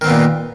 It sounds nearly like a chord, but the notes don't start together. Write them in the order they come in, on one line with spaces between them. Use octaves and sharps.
D#3 C4 B3 A#2